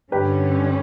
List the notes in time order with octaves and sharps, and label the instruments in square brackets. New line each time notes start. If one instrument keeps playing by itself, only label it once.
[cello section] G2 D3 G3 C#4 [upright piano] G4 B4